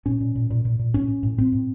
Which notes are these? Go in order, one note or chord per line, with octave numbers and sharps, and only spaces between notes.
A#2 C#4
A#2
A#2
A#2
A#2
A#2
A2 C#4
A2
A2
A2 C4
A2